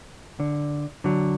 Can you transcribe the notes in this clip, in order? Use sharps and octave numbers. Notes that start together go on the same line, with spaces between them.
D3
D3 F#3